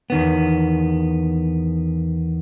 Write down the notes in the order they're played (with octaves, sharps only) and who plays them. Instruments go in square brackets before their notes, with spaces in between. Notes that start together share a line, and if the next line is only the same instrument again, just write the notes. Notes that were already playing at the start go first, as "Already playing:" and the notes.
[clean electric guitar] E2 D#3 B3